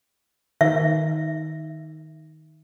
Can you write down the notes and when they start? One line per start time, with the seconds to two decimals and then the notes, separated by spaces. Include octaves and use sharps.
0.61 D#3 E5